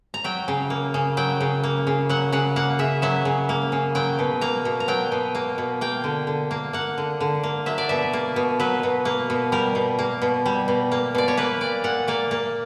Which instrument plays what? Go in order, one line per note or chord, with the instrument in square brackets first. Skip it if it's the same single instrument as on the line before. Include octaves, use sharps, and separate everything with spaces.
[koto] A#5
F#3 G5
C#3
A#3
C#3
F#3 G5
C#3
A#3
C#3
F#3 F#5
C#3 F#5
A#3 F#5
C#3 E5
F#3 E5
C#3
A#3
C#3
F#3 G5
B2
A#3 A#5
B2
A#5
F#3 G5
B2
A#3
B2
A#3 G5
D3
D3
A#3
A#3 F#5
D3
D3
A#3
F#3 E5
D5
B2 E5
A#3
B2
F#3 B4
B2
A#3
B2
G3 A#4
B2
A#3
B2
G3
B2
A#3
B2 D5
C#5
A#3 B4
A#2 D5
A#2 F#5
A#3 D5
A#3